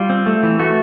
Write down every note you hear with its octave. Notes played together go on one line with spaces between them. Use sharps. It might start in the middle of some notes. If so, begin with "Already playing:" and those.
Already playing: G3 F4
C4
A3
E3
A3 F#4